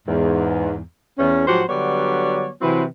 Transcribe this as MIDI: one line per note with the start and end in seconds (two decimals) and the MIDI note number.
0.07 0.79 40
0.07 0.79 44
1.18 1.47 40
1.18 1.47 61
1.47 1.63 44
1.47 1.63 53
1.47 1.63 54
1.47 1.63 67
1.47 1.63 72
1.47 1.63 78
1.69 2.49 50
1.69 2.49 54
1.69 2.49 55
1.69 2.49 59
1.69 2.49 73
1.69 2.49 74
2.61 2.84 48
2.61 2.84 52
2.61 2.84 54
2.61 2.84 60
2.61 2.84 64
2.61 2.84 71